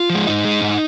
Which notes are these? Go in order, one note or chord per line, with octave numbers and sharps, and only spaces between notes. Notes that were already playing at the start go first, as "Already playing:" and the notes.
Already playing: F4
F3
G#3
G#2 D#4
G#3
G#2